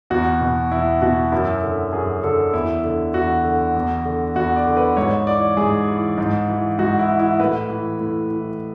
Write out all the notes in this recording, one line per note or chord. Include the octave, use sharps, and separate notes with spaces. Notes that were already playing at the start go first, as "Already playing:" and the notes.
E2 F#4
B2
E2 E4
B2 F#4
F#2 E4
D3
F#2 G#4
D3 A4
E2 E4
D3
E2 F#4
D3
E2
D3
E2 F#4
D5
D3
B4
G#2 C#5
E3 D5
G#2 G#4
E3
G#2
E3
G#2 F#4
E4
E3
E4
A2 B4
E3
A2
E3